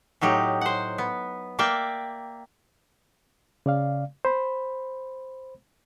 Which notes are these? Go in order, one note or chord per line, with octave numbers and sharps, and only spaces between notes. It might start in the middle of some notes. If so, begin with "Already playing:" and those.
A2 F#3 D#4 G4
C5 F#5
B3
A#3 D5 E5 G5
C#3 D5 F5
C5 B5